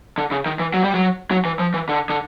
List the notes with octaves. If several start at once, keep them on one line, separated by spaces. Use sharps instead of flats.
D3
C#3
D#3
E3
F#3
G3
F#3
F#3
E3
F3
E3
D3
D3